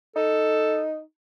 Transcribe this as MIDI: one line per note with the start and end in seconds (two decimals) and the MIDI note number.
0.16 1.00 63
0.16 0.85 69